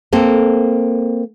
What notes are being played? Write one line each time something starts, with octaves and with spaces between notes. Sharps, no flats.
A#3 C4 A4